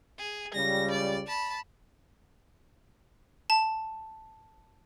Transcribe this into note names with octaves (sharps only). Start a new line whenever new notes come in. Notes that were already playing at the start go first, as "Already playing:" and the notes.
G#4
C#2 C#3 G3 A#6
D5
A5 B5
A5